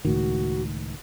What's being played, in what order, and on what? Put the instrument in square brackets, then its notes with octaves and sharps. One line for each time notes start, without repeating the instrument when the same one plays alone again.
[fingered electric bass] C#2 A2 D#3 [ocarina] F#4